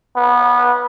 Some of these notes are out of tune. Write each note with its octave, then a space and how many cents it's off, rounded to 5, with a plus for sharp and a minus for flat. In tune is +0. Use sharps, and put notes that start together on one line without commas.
B3 -20